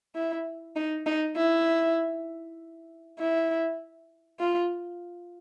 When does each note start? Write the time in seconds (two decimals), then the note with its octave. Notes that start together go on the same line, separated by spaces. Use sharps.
0.15 E4
0.76 D#4
1.06 D#4
1.37 E4
3.19 E4
4.40 F4